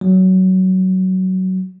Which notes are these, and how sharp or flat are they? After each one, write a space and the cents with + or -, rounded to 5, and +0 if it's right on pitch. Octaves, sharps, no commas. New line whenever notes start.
F#3 +15